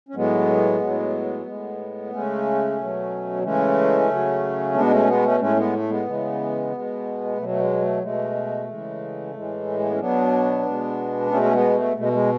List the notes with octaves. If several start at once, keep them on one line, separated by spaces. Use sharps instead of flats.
C#4
A2 F#3 G#3 B3
A2 F#3
A2 G#3
C#3 G#3 A3 C#4
B2 F#3
C#3 E3 G#3 A3 C#4
C#3 F#3
B2 G#3 B3 D4
A3 C#4
G#3 B3
A3 C#4
A2 G#3 A3 C#4
G#3 B3
A3
G#3 B3
C#3 E3 G#3
B2 G#3
B2 F#3 A3
A3
G#3
A3
B2 G#3 A3
C#3 E3 G#3
A2 E3 G#3
A3
B3
C#4
B2 F#3 B3 D4
B2 G#3
B2 G#3 A3 C#4
C#4
G#3 B3
A3
B2 G#3 A3
A3
G#3